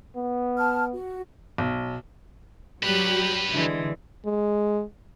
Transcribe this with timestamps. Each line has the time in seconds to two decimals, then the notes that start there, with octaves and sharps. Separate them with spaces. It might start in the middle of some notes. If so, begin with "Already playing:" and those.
0.16 B3
0.56 A5 F6
0.93 F#4
1.58 B1
2.83 F#3 G3 G4 B4 F#6
3.53 D3 E3 G#3
4.26 G#3